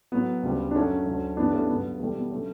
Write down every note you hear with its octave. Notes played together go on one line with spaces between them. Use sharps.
A2 F#3 B3
D2 C#3 G3
D4
F#2 D3 F#3 A3 C#4
D2 D3 F#3
G2 E3 G3 B3 D4
A3 C#4
G2 D3 F#3 B3
E2 B2 G3 A3
B3
D3 F#3 A3 C#4